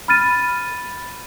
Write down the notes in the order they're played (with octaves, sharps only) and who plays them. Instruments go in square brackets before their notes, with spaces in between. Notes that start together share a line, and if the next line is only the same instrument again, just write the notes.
[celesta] B5 F6 A6 D#7